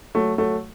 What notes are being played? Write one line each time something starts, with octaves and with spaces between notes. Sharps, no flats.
F#3 A3
F#3 A3